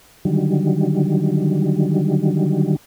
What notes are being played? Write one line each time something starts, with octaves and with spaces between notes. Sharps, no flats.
D3 D#3 F#3 G3